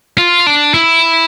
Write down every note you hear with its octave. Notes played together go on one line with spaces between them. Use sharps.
F4
D4
E4